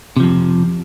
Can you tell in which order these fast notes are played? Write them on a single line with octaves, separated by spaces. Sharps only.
C3 F3 F2